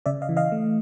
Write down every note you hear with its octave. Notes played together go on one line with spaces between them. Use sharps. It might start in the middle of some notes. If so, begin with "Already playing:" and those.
C#3 D5 E5
D#5 F5
E3
D#5 F5
A3